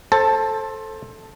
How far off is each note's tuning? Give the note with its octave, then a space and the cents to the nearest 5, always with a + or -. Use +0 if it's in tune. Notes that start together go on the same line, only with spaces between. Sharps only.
A4 +0 C5 +25 A5 +10